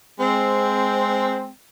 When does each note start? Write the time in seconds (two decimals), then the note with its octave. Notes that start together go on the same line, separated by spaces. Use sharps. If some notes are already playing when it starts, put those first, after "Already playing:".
0.20 G#3 C4